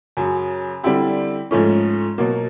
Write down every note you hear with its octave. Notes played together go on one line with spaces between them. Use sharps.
F#2 C#3 F#3
D3 G3 C4 E4 G4
G#2 F3 A3 C#4
B2 F#3 A#3